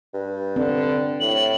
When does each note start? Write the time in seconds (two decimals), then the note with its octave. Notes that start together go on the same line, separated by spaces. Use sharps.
0.14 G2
0.56 D3 C4
1.20 A2 F#7